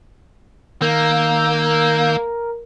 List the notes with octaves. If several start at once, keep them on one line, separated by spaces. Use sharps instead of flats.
D#3 A#3 A#4 E6 G6